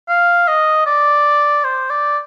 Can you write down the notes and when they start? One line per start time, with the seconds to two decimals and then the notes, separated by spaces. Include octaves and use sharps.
0.09 F5
0.48 D#5
0.86 D5
1.64 C5
1.90 D5